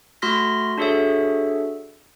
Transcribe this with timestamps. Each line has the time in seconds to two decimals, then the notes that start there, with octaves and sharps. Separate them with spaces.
0.22 A3 F#4 C6 F6 A#6 B6
0.78 D4 F#4 G#4 A4 C#5 E5